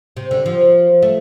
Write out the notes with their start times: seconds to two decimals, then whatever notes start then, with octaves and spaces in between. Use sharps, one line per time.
0.17 C3
0.31 D3
0.46 F3
1.02 A3